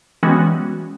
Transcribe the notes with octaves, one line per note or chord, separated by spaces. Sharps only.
E3 G3 G#3 B3 C#4 F#4